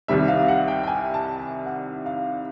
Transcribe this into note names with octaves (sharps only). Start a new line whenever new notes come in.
C2 C3 D#3 G3 E5
F5
F#5
G5
G5
G#5
A5
G#5
F#5
F5